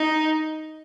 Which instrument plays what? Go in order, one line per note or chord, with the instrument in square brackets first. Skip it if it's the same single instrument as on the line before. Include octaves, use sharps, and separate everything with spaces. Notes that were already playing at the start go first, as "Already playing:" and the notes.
Already playing: [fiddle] D#4